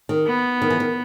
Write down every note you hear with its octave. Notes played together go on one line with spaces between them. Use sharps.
D#3
B3
D#3
E3
D#3